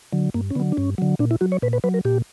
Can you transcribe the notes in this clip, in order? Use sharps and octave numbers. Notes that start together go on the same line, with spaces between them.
D3 F#3
G2 A#3
C#4
D3 F#3 B3
D4
G2 C#4
D3 F#3
A#2 D4
E4
F#3 F#4
C#5
A#2 B4
B4
F#3 B4
A#4
A#2 G4